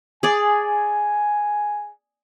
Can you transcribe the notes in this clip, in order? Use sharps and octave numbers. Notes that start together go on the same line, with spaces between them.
G#4 D5 G#5